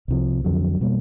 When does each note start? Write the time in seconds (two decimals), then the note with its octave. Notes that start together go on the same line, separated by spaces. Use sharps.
0.08 C2 C3 F3
0.44 F2 D3 F#3
0.81 B2 G3 A#3